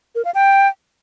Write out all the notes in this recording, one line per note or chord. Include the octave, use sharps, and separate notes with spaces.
A#4
F5
G5